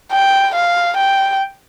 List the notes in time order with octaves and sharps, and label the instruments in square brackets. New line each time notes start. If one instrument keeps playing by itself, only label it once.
[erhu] G5
F5
G5